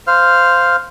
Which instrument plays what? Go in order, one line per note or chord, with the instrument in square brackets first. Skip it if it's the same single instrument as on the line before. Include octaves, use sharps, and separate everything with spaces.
[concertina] C5 F5 F6